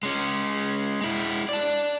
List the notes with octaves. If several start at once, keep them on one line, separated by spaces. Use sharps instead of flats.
G#3 C#4
G#3 E4
D5 A5